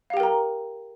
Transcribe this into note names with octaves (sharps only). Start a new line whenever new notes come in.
G4 A#4 F5 G5 A#5